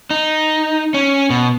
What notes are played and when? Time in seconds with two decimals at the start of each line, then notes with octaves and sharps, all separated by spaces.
0.10 D#4
0.94 C#4
1.30 B2